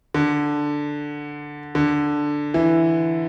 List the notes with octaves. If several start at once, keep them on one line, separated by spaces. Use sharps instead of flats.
D3
D3
E3